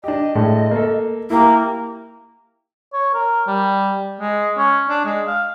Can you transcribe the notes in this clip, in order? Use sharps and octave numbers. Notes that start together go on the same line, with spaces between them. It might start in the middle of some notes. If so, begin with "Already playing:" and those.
D4 G4 D#5
A2 G#3
A#3 A4
A#3 E4 G4
C#5
A#4
G3
G#3
C#4
D4
G#3
F5